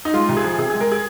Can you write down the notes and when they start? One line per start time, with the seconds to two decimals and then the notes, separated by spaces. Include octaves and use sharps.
0.05 D#4
0.13 G#3 F4
0.29 C2
0.37 G#4
0.44 F3
0.58 C3 G#4
0.70 G#3 G#4
0.81 A#4
0.92 G#4